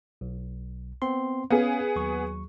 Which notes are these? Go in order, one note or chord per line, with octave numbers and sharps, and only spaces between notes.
B1
B3 C4 C6
B3 C#4 G#4 F5
D#2 F#3 C#6